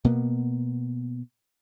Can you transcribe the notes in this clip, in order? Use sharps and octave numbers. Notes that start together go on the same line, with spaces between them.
B2 A#3 B3